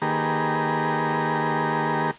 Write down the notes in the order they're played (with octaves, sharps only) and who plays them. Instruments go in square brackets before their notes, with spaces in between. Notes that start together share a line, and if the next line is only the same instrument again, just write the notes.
[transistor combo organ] D#3 A#3 G4 G#4 B4 A#5